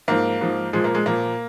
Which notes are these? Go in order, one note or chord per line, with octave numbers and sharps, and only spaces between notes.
G#2 F3 A#3
G#2 F3
A#2 F3 G#3
A#3
G#3
A#2 F3 A#3